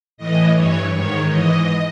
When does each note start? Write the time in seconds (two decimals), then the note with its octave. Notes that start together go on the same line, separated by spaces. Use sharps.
0.17 A2 E3 D#5
0.54 G2 E3 C#5
0.92 G#2 D#3 C#5
1.29 G#2 E3 D#5